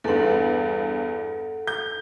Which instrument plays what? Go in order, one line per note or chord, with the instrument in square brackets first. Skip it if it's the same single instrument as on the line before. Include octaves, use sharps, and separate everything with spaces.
[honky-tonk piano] E2 G2 [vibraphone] A4 F#5
[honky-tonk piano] G6